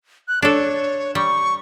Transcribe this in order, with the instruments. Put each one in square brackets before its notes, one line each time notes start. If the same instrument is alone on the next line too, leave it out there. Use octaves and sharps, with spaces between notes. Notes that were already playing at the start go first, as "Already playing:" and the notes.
[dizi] F#6
[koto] D4 A4 [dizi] C#5
[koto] G3 [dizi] C#6